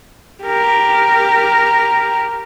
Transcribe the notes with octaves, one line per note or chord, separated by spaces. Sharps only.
G4 A#4